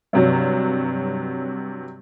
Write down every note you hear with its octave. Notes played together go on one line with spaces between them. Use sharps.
G2 C3 F#3